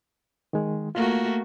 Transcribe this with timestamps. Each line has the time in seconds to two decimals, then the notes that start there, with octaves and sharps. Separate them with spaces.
0.53 D#3 G#3
0.95 A3 A#3 F4 F#4